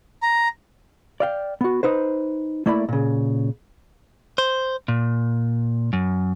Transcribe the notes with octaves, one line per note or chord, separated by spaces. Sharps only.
A#5
D5 F5 G5
B3 F#4
D#4 B4 C5
A3 A#3 E4 D5 B5
A#2 C#3
C5
A#2
F#2